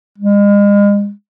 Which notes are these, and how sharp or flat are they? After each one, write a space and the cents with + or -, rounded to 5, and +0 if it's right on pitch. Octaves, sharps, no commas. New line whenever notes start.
G#3 -40